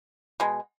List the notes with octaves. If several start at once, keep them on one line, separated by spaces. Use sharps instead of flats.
B2 G#3